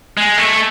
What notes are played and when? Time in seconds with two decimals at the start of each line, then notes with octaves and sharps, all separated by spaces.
0.17 G#3
0.38 A3